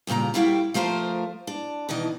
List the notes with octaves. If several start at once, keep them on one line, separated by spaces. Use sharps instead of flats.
D2 G2 A#2 C#3 A#5
F2 G3 E4 F#4 F5 G5
F3 A3 F4 A#4 C5
D4
B2 D#3 E3 D#5